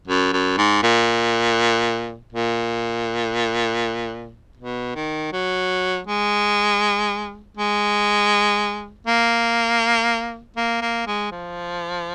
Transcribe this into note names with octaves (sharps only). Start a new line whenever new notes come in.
F#2
F#2
G#2
A#2
A#2
B2
D#3
F#3
G#3
G#3
A#3
A#3
A#3
G#3
F3